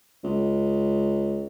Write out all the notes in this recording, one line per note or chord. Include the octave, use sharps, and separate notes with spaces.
C#2